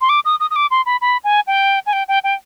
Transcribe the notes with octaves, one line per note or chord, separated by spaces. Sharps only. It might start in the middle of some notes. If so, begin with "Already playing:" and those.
C6
D6
D#6
D#6
D#6
D6
C6
B5
B5
G#5
G5
G#5
G5
G5
G5